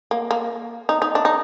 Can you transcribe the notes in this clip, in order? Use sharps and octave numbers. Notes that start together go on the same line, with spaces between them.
A#3
A#3
D#4
D#4
D4
D#4